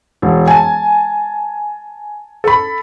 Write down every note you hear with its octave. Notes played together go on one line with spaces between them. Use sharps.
E1
G#5 A5
A4 B5